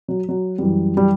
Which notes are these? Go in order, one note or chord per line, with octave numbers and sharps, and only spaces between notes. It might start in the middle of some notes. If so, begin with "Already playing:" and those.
F#3
F#3
F#2 E3 G3
G3